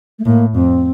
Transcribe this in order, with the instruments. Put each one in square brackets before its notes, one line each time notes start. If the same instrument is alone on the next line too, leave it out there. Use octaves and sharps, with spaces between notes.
[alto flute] A3
[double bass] A2 [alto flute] A#3
[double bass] F2 [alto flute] C4